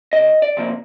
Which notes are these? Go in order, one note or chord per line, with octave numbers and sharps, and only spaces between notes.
C#2 D#5
D5
C3 F3 A#3